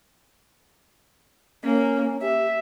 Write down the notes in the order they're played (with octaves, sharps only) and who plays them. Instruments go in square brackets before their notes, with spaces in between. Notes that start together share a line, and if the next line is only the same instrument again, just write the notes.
[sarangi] A#3 [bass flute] C#4
[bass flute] G4 [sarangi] E5